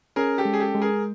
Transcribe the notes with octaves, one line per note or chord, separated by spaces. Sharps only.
C#4 G#4 A#4
G4 A4
G#3
G#4
G4 A4
G#3
G#4 A#4